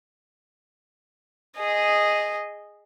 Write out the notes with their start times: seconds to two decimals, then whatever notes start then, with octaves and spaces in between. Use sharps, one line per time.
1.59 G#4 D#5